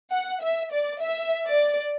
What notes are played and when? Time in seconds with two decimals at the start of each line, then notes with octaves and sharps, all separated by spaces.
0.12 F#5
0.42 E5
0.72 D5
1.02 E5
1.47 D5